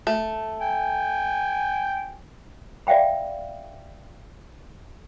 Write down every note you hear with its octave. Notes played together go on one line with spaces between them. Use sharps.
A3
G5 G#5
D5 E5 F5 G5 B5